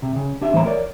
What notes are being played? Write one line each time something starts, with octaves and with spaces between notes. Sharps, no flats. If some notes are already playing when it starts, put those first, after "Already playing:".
C3
C#3
D4 G4 E5
A2 E3 A#3 C5 C#5 A#5
A#4 C#5 D5